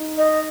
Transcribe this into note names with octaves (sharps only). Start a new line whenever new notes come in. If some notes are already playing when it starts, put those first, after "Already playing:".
Already playing: D#4
D#5